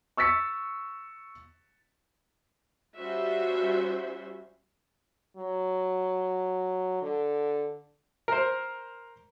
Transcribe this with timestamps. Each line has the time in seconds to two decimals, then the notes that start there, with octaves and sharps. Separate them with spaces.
0.17 C#6 E6 A6 B6 C#7
2.97 G3 C#4 F4 F#4 C5 E5
5.37 F#3
7.02 D3
8.28 A#4 C5